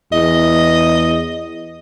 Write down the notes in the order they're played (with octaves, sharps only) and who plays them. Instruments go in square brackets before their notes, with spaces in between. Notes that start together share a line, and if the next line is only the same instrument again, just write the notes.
[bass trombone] E2 [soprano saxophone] D#5